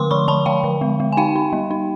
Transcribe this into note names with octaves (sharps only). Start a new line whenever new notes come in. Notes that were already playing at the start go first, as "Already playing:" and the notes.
Already playing: D3 A3 C6 D6
F3 B5 C#6
F3 A5 B5
F3 F5 G5
D3
G#3
G#3
G#5
D#4 F5 G5
D#4
G3
D#4